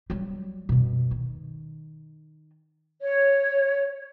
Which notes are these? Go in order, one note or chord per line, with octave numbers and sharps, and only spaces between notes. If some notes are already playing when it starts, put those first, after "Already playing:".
F#3 G3
F#2 B2
D#3
C#5